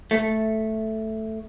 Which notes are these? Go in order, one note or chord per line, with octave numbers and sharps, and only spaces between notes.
A3